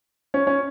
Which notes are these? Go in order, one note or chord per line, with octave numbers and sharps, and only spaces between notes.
C#4
C#4